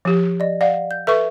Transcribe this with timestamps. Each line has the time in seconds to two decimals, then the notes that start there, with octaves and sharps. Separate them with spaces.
0.05 F3 G4
0.40 D5 D#5
0.61 D5 F5 F#5
0.91 G6
1.07 A4 B4 E5 C#6